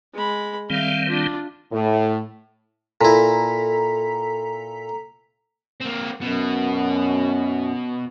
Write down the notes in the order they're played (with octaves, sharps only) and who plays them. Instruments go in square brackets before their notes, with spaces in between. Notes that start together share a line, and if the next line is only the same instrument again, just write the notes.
[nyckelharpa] G#3 B5
[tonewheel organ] D#3 G3 C4 [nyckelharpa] E5 F5
[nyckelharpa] D4 F4
[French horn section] A2
[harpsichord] A#2 E4 [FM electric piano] A4 A#5 B6
[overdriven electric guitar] A#3 C4
[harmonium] F#2 [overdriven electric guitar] B2